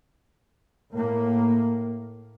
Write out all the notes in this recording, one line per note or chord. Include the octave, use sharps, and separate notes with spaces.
A2 A#3